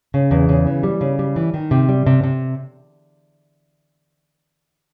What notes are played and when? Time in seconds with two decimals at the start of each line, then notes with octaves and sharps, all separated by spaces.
0.14 C#3
0.31 E2
0.49 C#3
0.67 E3
0.83 G3
1.01 C#3
1.19 G3
1.36 E3
1.54 D#3
1.71 C3
1.89 G3
2.06 C3
2.23 C3